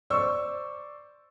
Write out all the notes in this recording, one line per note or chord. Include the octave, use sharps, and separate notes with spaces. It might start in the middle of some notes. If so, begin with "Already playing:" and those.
C5 D5 C#6 E6